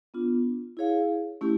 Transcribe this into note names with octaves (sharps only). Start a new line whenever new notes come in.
B3 D4 F4
E4 G#4 C#5 F5
A3 C#4 E4 G4